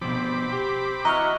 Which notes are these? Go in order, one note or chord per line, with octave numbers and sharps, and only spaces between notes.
B2 F3 C4 B5 D6
G4
E3 F#4 D#5 A#5 C#6 F6